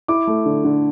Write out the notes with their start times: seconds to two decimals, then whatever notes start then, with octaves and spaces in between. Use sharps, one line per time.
0.08 E4 D6
0.27 A3
0.45 D3
0.64 D3